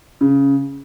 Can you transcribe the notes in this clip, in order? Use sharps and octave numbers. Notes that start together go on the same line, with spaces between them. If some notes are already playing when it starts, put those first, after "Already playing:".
C#3